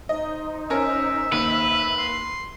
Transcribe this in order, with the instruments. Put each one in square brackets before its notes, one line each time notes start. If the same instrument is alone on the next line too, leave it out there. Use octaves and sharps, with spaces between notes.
[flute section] D#4 C5 [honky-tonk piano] D#5
[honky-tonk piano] C#4 A#4 [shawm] E5
[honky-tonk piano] D#2 [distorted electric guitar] B4
[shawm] C6